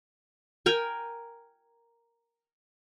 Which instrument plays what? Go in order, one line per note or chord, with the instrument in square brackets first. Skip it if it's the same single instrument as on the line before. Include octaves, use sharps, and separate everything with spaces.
[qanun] A#4 G5 G#5